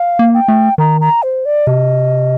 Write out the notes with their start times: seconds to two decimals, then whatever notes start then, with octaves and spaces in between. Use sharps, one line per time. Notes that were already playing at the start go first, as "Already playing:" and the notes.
Already playing: F5
0.19 A#3
0.34 G5
0.48 A3
0.78 D#3 A#5
1.01 A#5
1.23 C5
1.45 D5
1.67 C3 D#5